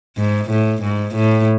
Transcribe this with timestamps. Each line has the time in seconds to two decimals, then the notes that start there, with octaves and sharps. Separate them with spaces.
0.17 G#2
0.50 A2
0.83 G#2
1.15 A2